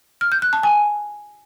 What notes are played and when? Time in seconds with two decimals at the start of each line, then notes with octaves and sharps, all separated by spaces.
0.21 F6
0.32 G6
0.42 F#6
0.53 A5
0.63 G#5